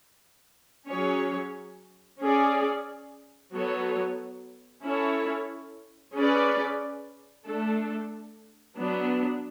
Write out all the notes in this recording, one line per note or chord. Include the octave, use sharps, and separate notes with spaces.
F#3 C#4 G#4 C#5
C#4 G#4 D5
F#3 B3 F#4 A4 C#5
C#4 E4 A4 C#5
C#4 G#4 B4 D5
A3 D4 A4
F#3 B3 D4